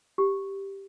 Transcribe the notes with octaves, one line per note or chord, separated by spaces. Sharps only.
G4